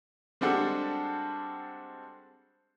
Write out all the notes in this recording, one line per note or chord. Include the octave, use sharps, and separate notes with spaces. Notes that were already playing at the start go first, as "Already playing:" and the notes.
G3 G#3 C4 D4 F#4 A4